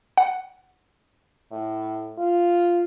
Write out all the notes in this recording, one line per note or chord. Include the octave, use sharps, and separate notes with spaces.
F#5
A2
F4